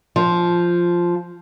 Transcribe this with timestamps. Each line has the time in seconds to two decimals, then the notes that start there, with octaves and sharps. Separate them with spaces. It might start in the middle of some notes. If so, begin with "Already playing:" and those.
0.16 F3